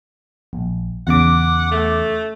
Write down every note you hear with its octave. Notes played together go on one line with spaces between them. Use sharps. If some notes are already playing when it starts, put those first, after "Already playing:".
A#1
E2 C#3 F#5 D6
A3